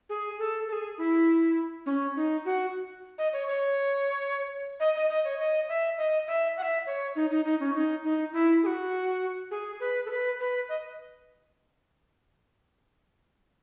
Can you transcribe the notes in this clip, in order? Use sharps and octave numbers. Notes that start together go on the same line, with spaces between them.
G#4
A4
A4
G#4
E4
C#4
D#4
F#4
D#5
C#5
C#5
D#5
D#5
D#5
C#5
D#5
E5
D#5
E5
F#5
E5
C#5
D#4
D#4
D#4
C#4
D#4
D#4
E4
G#4
F#4
G#4
B4
A4
B4
B4
D#5